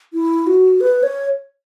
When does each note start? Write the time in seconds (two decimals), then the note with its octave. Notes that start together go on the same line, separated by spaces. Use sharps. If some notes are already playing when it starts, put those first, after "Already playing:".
0.14 E4
0.47 F#4
0.81 B4
1.03 C#5